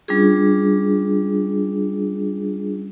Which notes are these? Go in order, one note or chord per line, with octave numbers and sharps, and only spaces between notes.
G3 C#4 D4 F4 G#4